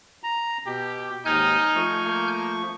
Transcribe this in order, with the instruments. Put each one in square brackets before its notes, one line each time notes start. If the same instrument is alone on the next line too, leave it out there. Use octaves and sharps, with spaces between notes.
[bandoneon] A#5
[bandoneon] B2 [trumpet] G4
[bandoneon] D#2 G#2 [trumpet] D#4 [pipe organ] G#5 F6 G6
[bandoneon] F3 A3 C#6
[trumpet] A#3